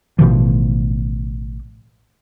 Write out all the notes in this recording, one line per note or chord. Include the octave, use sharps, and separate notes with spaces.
A1 B2 D#3 F3